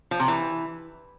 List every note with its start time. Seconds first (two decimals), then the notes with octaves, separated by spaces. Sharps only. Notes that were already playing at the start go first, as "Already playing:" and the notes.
0.11 F3
0.20 C3
0.28 E3